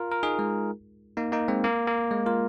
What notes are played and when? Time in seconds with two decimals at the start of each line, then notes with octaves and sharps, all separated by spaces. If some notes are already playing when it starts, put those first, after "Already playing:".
Already playing: F4 A#4
0.11 A#4
0.23 D#4 G#4
0.39 G#3
1.17 A#3 D#4
1.32 A#3 D#4
1.48 G#3 C4
1.64 A#3
1.88 A#3
2.11 G#3
2.26 F4 A#4